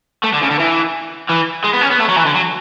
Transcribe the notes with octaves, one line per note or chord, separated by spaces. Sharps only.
A3
D3
C#3
D3
E3
E3
G#3
B3
C#4
B3
A3
F#3
E3
D3
F#3